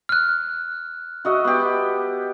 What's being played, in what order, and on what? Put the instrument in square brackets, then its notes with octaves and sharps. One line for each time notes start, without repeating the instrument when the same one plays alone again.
[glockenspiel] F6 F#6
[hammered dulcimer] F#4 D#5 E5
B3 G4